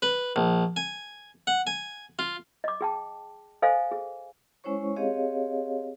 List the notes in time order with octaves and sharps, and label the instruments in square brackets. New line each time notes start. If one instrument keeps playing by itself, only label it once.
[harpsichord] B4
A#1
G#5
F#5
G#5
F4
[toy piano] D#5 D6
G#4 G5 A5
A4 C5 D#5 F5 G#5
G#4
[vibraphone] G#3 C#4 E4 C5 C#5 C#6
C4 G4 G#4 C#5 D#5 F5